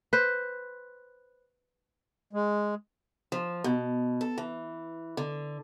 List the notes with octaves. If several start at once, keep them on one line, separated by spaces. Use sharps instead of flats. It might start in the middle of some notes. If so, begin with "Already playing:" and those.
B4 C5
G#3
F3
B2
A4
E3
D3